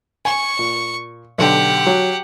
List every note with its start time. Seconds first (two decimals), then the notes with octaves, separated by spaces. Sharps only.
0.25 G#5 C#6
0.59 A#2
1.38 B1 D3 G4 F#5
1.87 F#3